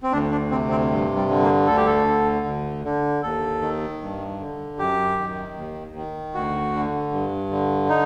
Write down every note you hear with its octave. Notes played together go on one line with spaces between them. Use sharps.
C4
D2 D4
D4
C3 C4
C4
G2
G3
D3
A#3
D2 A4
G4
A4
D3
D2
D3
D#2 A4
D#3
G2
D3
F#2 G4
D#3
D#2
D#3
D2 F#4
D3
G2
D3
D#4